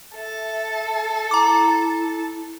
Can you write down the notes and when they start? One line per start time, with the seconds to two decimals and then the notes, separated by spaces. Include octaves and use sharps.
0.16 A4 E5
1.31 E4 A#5 D6